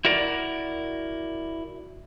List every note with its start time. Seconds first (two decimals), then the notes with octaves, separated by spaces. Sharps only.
0.05 E4 F#4 A#4 D5